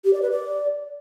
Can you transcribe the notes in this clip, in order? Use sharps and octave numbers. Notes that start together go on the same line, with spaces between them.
G4
D5
B4
D5